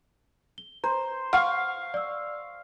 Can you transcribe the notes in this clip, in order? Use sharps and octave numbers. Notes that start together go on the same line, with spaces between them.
G7
C5 A#5
F5 F#5 C#6 F6
D5 E6